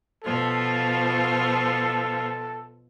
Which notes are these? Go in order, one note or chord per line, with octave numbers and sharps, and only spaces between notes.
B2 F3 F4 A4